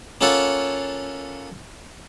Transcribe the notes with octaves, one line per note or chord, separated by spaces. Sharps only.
A#3 C#4 F4 A4 C#5 F#5